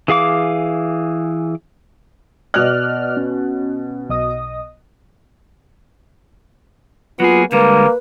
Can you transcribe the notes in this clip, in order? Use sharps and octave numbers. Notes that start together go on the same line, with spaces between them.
E3 G#4 F5 D6
B2 D5 D#5 F6 F#6
C#4
B1 D#5 D#6
F#3 A#3 B3 F4 G#4
D3 G3 G#3 A#3 B4